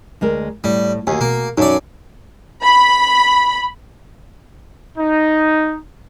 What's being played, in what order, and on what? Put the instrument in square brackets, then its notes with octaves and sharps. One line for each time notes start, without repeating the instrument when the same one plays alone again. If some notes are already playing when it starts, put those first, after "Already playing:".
[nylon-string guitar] D2 G#3 A#4
[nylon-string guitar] A2 [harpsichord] G3
[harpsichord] D#2 [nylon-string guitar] F#4 G#4 [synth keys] G#5
[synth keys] B2 [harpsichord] A#3
[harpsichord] F#2 D5 [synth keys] D#4 [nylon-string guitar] A4
[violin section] B5
[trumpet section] D#4